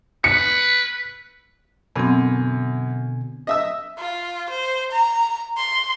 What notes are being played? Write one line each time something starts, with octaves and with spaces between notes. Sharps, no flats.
B4 C#7
F#2 B2 D3 B3 C4 G#5
D#5 E5 E6
F4
C5
A#5
C6